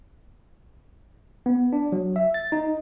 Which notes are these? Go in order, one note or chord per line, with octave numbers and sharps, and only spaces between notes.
B3
D4
F#3
E5
A6
D#4